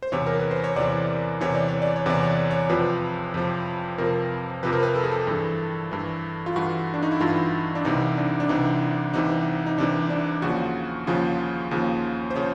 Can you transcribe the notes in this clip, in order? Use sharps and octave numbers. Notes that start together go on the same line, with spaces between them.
C5
E2 C3 E3 C#5
A#4
B4
C5
C#5
E2 C3 E3 D5
E2 C3 E3 C#5
D5
C#5
D5
C#5
E2 C3 E3 D5
C#5
D5
C#5
F2 C3 F3 B4
F2 C3 F3
F2 C3 F3 A#4
F2 C3 F3 B4
A#4
B4
A4
G#4
A4
G2 E3
G2 E3
F4
G2 E3 F#4
D4
D#4
E4
G2 E3 F4
D4
C2 C3 E3 D#4
D4
D4
C2 C3 E3 D#4
C2 C3 E3 D#4
D#4
C2 C3 E3 D4
D4
D#2 C#3 F3 F#4
D#2 C#3 F3 G#4
D#2 C#3 F3
C5
C#3 F3 C#5